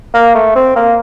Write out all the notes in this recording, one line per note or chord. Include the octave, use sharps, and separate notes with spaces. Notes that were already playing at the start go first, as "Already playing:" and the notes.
A#3
A3
C4
A#3